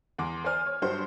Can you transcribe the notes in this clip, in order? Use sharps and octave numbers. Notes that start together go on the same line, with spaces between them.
E2 C6 D6
C5 D5 G#5 F6
C#5
G2 F#3 G3 C5